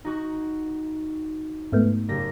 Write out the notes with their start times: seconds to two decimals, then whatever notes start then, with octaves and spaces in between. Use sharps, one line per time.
0.05 D#4 F#4 C#6
1.72 G#2 A3 B3
2.08 F#1 G4 A#6